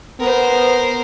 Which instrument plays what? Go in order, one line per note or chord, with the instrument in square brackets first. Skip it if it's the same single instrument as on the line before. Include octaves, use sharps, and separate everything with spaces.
[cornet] B3 [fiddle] A#4 C5